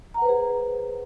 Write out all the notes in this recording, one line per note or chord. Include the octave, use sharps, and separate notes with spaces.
G#4 B4 C5 F#5 A#5